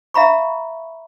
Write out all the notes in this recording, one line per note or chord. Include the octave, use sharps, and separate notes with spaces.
E5 F5 A#5 B5 C#6